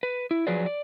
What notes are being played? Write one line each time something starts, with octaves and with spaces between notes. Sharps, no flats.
B4
E4
F3 F#3 G#4 B4 D5
D5